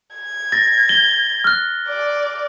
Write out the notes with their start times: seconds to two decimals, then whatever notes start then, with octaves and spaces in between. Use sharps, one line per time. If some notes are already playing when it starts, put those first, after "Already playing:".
0.16 G#6
0.52 A6 A#6
0.89 G7
1.44 F6 F#6
1.88 D5